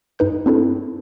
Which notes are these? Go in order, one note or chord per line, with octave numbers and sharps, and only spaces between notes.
G2 D#4 B4 G6
C4 D4 E4 A4